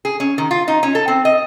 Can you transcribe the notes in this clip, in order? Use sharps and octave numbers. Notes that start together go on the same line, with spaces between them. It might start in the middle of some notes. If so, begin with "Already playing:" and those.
G#4
C#4
D#3
F4
D#4
C#4
A4
C4
D#5